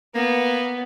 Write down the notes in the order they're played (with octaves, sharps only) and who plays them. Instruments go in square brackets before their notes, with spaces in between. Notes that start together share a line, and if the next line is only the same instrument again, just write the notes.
[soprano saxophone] A#3 [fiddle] B3